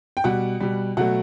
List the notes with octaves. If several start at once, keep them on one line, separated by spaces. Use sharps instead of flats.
G5
B2 G3 F#5
B2 G3
B2 F#3 A3 F#5